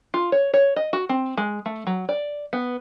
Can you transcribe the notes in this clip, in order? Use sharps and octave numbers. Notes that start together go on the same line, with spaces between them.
F4
C#5
C#5
D#5
F#4
C4
G#3
A3
F#3
D5
B3